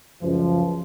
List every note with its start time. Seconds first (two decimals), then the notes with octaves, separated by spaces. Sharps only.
0.22 C#2 F#2 F3